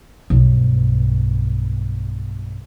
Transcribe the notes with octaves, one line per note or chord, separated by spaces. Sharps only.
B1 G2